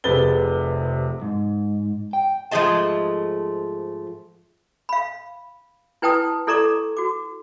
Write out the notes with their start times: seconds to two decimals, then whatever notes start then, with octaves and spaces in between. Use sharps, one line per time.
0.04 F1 C3 G#4 B4 A6 G7
1.22 G#2
2.13 G5
2.51 G#2 F3 A3 G#4 D#5 A5
4.89 F5 B5
6.02 E4 B4 G5 A5 D#6
6.47 E4 A4 D5 A#5 C#6 D6
6.97 F#4 D6